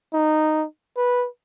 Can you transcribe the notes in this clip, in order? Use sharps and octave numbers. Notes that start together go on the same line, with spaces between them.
D#4
B4